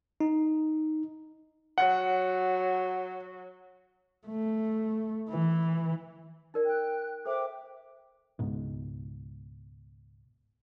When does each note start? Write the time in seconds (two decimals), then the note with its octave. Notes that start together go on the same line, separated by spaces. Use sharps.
0.20 D#4
1.78 F#3 F#5
4.27 A3
5.29 E3
6.54 D#4 A#4 D5
6.66 G5 F#6
7.25 A4 C5 E5 G5 D6
8.39 C#2 G#2 B2